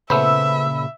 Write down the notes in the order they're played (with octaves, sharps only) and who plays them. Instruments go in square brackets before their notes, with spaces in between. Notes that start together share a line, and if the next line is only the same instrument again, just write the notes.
[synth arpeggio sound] A#2 C#3 [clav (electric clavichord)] A3 B3 C5 [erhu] E5 [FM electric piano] B5 E6